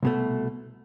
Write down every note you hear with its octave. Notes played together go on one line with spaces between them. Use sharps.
C2 B2 A3